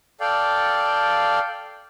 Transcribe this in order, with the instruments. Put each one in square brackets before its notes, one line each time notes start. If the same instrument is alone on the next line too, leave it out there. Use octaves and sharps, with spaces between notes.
[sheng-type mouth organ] A4 D5 F5 G5